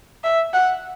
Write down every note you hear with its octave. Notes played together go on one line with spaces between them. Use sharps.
E5
F#5